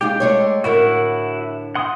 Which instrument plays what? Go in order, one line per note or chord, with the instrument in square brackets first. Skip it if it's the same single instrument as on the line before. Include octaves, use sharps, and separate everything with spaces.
[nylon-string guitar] G#3 D#4 F4 [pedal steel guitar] G4
[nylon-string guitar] G#3 A3 C#5
[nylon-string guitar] A2 D3 A#4 [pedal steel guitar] E4 F#4
[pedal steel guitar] F#5 C6 D#6